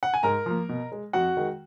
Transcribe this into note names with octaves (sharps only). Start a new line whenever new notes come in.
F#5
G#5
G#2 A#4 A#5
F3 A#3
B2
G#3
F2 F#4 F#5
D#3 G#3